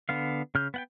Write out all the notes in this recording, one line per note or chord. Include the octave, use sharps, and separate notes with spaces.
D3 B3 F5
C#3 F6 G6
B3 F#5 G5